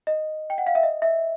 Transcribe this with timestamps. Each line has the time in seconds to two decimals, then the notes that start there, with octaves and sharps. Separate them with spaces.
0.07 D#5
0.50 G5
0.58 F#5
0.67 F5
0.75 E5
0.83 D#5
1.02 E5